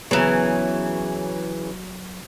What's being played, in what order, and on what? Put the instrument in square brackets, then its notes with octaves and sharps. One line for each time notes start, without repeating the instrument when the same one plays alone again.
[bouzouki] C#3 E3 [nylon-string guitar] F#3 B3